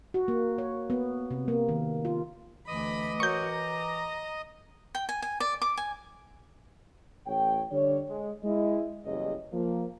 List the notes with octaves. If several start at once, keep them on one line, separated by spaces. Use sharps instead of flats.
F#4
A#3
C#5
B3
C3
A#3
D#3
F4
D2 E3 D#5 B5 D6 D#6
F#4 A#4 C#5 C#6 G6
A#5
G5
G#5
G#5
D5
D6
G#5
A1 A2 C#5 G5
D3 G3 D4 C#5
G#3
G#3 E4 D#5
F#1 E2 C#3 G3 D#5
F3 A#3